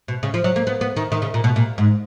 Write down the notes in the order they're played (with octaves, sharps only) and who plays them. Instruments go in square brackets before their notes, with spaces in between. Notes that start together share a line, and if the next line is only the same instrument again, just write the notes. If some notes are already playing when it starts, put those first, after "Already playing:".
[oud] B2
C#3
F3
F#3
A#3
B3
B3
D#3
D#3
C#3
A#2
B2
A#2
G#2